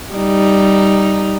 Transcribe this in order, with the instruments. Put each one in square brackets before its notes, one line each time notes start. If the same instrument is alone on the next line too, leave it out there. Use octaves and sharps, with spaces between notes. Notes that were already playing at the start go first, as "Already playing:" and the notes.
[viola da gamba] G3 D#4